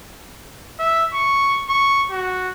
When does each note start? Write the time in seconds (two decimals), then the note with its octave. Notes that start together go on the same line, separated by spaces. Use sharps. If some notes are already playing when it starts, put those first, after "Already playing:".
0.79 E5
1.14 C#6
1.69 C#6
2.11 F#4